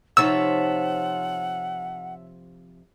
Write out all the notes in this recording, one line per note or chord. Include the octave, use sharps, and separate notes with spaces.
C3 F3 D#4 C#5 E5 F#5 A5 E6